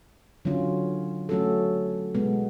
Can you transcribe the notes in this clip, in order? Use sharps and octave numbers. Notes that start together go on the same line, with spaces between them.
D3 F#3 C#4 F4
F#3 A3 C#4 F#4 A4
B2 G#3 B3